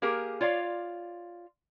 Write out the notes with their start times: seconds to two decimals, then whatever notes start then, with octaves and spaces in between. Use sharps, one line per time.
0.02 A#3 G4 G#4 A#4
0.41 F4 C#5 D5 F5